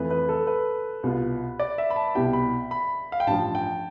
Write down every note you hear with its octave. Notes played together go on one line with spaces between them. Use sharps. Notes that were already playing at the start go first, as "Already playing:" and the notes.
Already playing: F2 E3 A3 B4
B4
A4
B4
C2 B2 B3 F4
D5
E5
B5
A5
C2 B2 B3 E4 G4 G5
B5
B5
F5
G5
A1 G2 F3 A5
G5